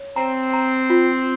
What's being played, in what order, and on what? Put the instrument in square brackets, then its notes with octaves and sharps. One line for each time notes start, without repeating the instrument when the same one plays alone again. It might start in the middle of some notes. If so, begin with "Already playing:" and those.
Already playing: [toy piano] C#5
[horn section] C4 [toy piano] A#5
[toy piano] A#5
F4